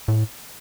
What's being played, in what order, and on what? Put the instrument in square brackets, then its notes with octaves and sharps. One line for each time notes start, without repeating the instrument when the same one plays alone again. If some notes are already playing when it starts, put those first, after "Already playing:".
[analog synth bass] A2